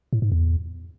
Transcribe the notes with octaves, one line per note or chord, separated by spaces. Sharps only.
A2
G#2
E2